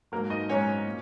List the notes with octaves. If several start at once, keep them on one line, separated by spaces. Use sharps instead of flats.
G#2 F#3 A#3 A#4
D#4 D#5
G#2 F#3 C#4 C#5
A#2